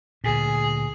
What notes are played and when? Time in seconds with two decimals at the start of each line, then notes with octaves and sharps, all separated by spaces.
0.24 D2 A#2 G#4